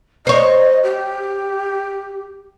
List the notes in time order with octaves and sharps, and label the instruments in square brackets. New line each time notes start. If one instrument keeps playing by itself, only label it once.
[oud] C5 C#5 [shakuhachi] D#5
[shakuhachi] G4